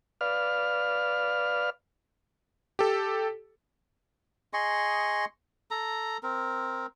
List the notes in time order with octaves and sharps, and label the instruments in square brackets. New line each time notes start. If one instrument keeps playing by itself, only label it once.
[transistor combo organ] B4 D5 F5 F6
[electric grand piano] G4 A4
[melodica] G#4 D#5 C6 C#6
A4 A#5
C4 A#4